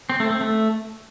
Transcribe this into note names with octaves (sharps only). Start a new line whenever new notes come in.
C4
A3
C4
A3